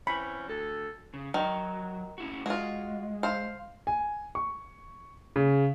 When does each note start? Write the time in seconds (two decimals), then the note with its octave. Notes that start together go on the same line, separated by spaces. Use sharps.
0.07 E3 C4 C#4 B5
0.48 D2 A4
1.14 C#3
1.34 D#3 F#3
2.18 C#4 E4 F#4
2.46 G#3 F4 F#4
3.23 C5 F5
3.87 G#5
4.35 C#6
5.36 C#3